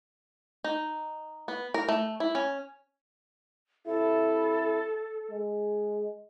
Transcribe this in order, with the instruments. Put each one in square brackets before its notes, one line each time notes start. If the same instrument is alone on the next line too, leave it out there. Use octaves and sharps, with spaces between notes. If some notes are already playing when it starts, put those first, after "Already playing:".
[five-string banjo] D#4
B3
A#4
A3
E4
C#4
[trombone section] C3 E4 [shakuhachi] A4
[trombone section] G#3